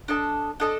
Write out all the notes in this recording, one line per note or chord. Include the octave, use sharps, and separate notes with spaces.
D4 A4 D#5 A5
D4 A4 D#5 A5